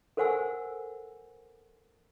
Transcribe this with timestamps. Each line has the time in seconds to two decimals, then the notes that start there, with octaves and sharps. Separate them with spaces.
0.17 A4 A#4 C5 F#5 G#5 E6